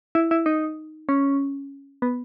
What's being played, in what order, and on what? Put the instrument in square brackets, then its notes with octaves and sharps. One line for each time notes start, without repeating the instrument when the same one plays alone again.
[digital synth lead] E4
E4
D#4
C#4
B3